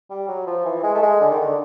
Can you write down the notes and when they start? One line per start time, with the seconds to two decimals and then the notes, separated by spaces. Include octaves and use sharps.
0.10 G3
0.28 F#3
0.47 F3
0.65 E3
0.83 G#3
0.94 A3
1.03 G#3
1.21 D3
1.31 D#3
1.41 D3